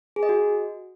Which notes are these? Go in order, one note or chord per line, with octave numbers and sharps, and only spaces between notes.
G#4
D#5
F#4